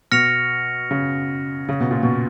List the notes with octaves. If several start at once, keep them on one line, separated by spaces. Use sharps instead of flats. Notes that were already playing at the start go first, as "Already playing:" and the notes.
B2 F6 A#6 C#7 F7
C#3
C#3
B2
A#2
B2